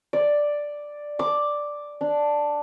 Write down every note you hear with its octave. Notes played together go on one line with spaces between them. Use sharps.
D5
D6
D4